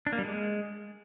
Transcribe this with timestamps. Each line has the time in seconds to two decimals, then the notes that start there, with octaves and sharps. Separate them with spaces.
0.07 D4
0.13 A#3
0.19 G3
0.25 G#3